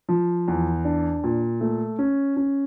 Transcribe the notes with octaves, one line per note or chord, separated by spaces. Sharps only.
F3
E2
D4
A#2
A3
C#4
C#4